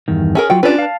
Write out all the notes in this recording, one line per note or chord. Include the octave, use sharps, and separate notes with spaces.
E2 G2 D#3
C#4 G#4 A#4
F#3 F4 F#4 G5
C#4 D4 F4 G4 B4
F5 A5